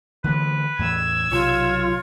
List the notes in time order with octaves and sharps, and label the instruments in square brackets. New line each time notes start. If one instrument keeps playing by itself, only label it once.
[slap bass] D3 E3 A3 [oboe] B4
[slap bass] E2 A2 [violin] E6 G#6
[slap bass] B1 C3 F#3 [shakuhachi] F4 [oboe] C#5